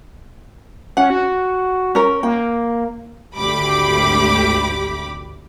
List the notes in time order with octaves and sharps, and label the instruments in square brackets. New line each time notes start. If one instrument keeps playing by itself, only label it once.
[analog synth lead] C#4 [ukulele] F#5
[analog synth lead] F#4
[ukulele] C#4 A#4
[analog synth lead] A#3 [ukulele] G5
[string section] G#1 D2 G4 B5 D6